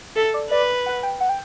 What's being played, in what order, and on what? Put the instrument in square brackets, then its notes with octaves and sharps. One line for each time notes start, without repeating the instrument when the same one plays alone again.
[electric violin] A4 [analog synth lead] E5
[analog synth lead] D5
[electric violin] B4 [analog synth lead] D5
[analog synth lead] F#5
G5
F#5
G5